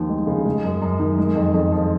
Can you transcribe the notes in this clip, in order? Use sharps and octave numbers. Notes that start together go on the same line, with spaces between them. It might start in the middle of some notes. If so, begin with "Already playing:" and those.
Already playing: D#2 F3
G#3
C#3
G#3
F#2
F#2
D#3
G#3
F2
F2
F3